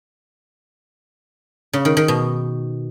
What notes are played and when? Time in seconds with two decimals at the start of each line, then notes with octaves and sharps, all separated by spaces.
1.73 C#3
1.85 D#3
1.97 D#3
2.08 B2